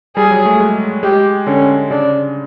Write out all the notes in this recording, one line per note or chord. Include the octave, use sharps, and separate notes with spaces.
G3 G#4
F#3
A3
G#3
G#3 G4
D3 C#4
C#3 D4